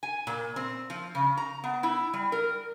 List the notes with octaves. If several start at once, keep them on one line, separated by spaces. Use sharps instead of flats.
G#5
A#2
C4
F3
C#3
A#5
B3
E4
G3
A#4